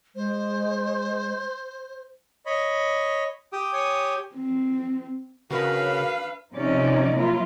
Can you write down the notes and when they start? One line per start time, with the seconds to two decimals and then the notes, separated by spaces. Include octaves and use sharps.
0.16 G#3 C5
2.46 C#5 D#5 B5
3.53 G4 G5 D#6
3.73 C#5 G#5 D#6
4.35 C4
5.51 C#3 D4 F#4 A#4 B4 F5 B5
6.54 C3 F3 C#4 D#4 D5
7.15 F#3 A#3 E4 F4